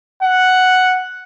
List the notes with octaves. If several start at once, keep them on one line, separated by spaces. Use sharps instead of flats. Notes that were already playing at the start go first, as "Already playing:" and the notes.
F#5